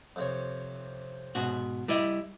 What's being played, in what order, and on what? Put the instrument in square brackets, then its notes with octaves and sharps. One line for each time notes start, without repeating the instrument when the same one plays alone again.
[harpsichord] F2 C3 C#5
[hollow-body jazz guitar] G#2 B2 F#4
G3 E4 D#5